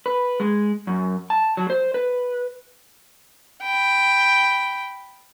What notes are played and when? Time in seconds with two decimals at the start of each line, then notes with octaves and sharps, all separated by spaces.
0.06 B4
0.40 G#3
0.87 F#2
1.30 A5
1.57 F#3
1.70 C5
1.94 B4
3.62 G5 B5